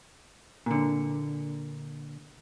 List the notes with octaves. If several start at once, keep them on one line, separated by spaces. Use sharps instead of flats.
A#2 D3